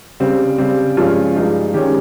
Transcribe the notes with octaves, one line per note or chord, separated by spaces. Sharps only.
C#3 G3 C4
C#3 G3 C4
G2 F3 G#3 C#4 F4
G2 F3 G#3 D#4
D#3 G#3 C#4 G4